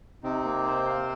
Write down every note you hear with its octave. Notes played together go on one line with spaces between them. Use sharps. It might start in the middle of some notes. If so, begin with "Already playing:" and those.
C3 C4 D#4
A#3
C5
F5